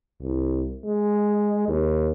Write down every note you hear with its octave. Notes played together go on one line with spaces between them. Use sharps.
C2
G#3
D#2